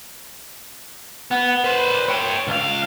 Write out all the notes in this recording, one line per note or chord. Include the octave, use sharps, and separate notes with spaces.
B3
B4 C5
C#5 G5
C#2 F5